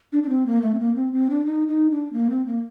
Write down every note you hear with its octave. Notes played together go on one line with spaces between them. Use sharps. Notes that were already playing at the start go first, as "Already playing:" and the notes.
D4
D4
C4
A#3
A3
C4
A#3
C4
C4
D4
D#4
D#4
D4
A#3
C4
A#3